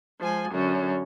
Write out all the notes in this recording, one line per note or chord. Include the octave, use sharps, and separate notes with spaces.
F3 G#3 G#5
F#2 D3 C#4